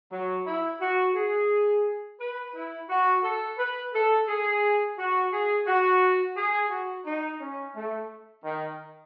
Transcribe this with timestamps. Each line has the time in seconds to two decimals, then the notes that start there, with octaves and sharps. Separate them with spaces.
0.12 F#3
0.46 E4
0.80 F#4
1.15 G#4
2.20 B4
2.54 E4
2.89 F#4
3.23 A4
3.58 B4
3.93 A4
4.28 G#4
4.97 F#4
5.32 G#4
5.66 F#4
6.36 G#4
6.70 F#4
7.05 D#4
7.40 C#4
7.75 A3
8.44 D#3